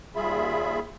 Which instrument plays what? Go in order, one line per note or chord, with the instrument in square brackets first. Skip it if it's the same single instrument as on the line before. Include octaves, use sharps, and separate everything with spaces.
[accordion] D#2 G3 F4 G#4 E5 B5